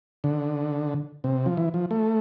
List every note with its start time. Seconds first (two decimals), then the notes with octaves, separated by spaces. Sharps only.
0.24 D3
1.24 C3
1.46 F3
1.57 E3
1.74 F3
1.91 A3